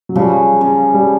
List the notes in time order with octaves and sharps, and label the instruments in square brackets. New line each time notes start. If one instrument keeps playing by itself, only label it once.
[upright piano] F#3
[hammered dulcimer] C#3 [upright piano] F3 G3
[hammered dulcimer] C#3
[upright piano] G3